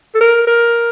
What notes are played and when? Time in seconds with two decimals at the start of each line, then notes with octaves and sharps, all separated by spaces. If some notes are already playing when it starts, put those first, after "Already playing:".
0.15 A4
0.20 A#4
0.47 A#4